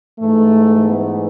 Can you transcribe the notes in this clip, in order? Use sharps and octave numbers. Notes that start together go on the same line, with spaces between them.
G#2 E3 A3
B3